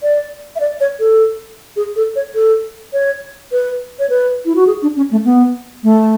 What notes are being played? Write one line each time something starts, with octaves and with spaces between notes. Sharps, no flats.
D5
E5
D5
C#5
A4
G#4
A4
C#5
A4
C#5
B4
C#5
B4
E4
F#4
G#4
D4
C#4
A3
B3
A3